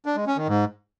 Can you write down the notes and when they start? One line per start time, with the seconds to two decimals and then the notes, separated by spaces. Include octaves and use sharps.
0.06 D4
0.16 G#3
0.27 C#4
0.37 D#3
0.48 G#2